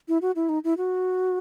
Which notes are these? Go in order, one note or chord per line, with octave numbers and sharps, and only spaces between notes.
E4
F#4
E4
D#4
E4
F#4